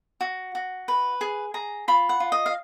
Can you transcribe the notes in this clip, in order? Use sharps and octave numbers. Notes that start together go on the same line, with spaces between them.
F#4
F#4
B4
G#4
G#4 A#5
F4 B5
F#5
F4
D#5
F5